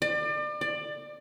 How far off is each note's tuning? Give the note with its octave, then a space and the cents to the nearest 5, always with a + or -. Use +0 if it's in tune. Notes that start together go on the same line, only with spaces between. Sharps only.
D5 +35
D5 +20